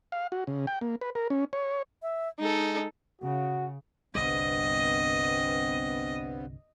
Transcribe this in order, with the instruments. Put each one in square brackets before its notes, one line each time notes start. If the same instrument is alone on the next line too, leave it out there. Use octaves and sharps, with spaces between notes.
[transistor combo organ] F5
F#4
C#3
G5
A#3
B4
A#4
C#4
C#5
[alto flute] E5
[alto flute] G#3 [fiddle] D#4 A4
[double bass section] C#3 [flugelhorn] F#4
[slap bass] G1 C2 G3 [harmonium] G2 B3 C4 [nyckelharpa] D#5